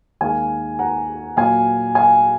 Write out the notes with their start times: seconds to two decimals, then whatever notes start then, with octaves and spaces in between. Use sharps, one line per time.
0.21 D#2 D#3 G#3 F5 G#5
0.79 F#5 A#5
1.37 A#2 F#3 F5 G#5
1.95 F5 G#5